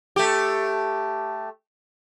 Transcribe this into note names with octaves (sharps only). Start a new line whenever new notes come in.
A3 G4